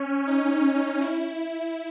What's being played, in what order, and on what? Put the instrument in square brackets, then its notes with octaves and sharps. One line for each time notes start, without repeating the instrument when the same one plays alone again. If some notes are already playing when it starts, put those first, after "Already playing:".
Already playing: [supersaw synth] C#4
D#4
D#4
E4